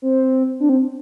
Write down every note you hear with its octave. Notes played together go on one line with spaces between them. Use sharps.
C4
D4
C4